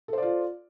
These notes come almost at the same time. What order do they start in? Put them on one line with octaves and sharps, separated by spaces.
A4 C5 D5 F4